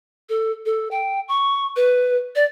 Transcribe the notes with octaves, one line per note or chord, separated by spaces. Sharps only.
A4
A4
G5
C#6
B4
D5